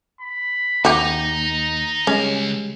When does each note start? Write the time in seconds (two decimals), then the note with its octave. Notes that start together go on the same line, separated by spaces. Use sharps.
0.21 B5
0.85 D#2 D#4 F#4 G4 A#5
2.07 C#2 G3 G#3 C#4 F5